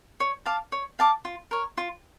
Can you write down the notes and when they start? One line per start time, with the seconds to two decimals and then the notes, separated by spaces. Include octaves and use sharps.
0.20 C#5
0.46 F5 A5 D6
0.72 C#5
0.99 F5 A5 D6
1.25 F4
1.51 A#4 C#5
1.78 F4